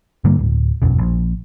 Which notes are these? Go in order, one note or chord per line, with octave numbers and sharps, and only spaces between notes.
G2 D3 G3 A#3
D1
E1 B1 F#2
A#1